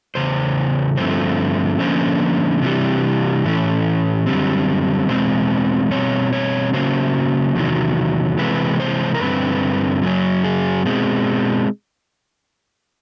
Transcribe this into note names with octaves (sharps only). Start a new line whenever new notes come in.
E2 C#3 C5
G2 D3 F3 A3 C4 C5
D3 F3 A#3 C#4 C5
C3 E3 G3
A2 E3 A3 C#4
F#2 D3 G3 C4
E2 B2 G#3 C4 C5
B2 G3 C4 C#5
C#5
C#3 F#3 A#3 C#4 C5
E2 C3 D#3 F#3
C3 E3 G#3 C4 B4
C5
A#4
G2 D3 G3 C4 B4
F#2 C#3 F#3
G#4
B2 G#3 C4